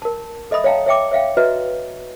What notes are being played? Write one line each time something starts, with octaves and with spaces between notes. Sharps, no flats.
A#4 A5
A4 D#5 E5 B5 D#6
C#5 E5 F5 G5 A5 A#5
C#5 E5 G5 D6
C#5 E5 F5 G5
F#4 B4 D#5 E5 A#5